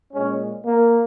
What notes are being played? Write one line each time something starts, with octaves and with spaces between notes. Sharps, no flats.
A#2 G#3 C#4
A#3